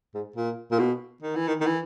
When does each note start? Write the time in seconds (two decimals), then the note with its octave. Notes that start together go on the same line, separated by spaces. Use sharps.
0.15 G#2
0.36 A#2
0.71 A#2
0.79 B2
1.22 D#3
1.35 E3
1.47 D#3
1.61 D#3
1.66 E3